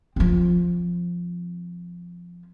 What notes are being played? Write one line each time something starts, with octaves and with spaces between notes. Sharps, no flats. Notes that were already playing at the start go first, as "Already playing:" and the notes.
F3 C4